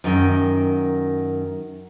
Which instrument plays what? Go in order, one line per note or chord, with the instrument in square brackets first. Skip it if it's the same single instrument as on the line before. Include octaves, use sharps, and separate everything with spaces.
[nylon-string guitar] F#2 D#3 G5